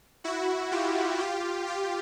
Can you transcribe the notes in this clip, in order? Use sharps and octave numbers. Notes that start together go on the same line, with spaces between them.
E4 F#4
F4 G4
F4 G4
F4 G4